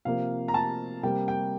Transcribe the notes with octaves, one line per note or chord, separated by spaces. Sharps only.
C3 F3 A#3 F5
A#5
A5
C3 G3 A#3 G5
G5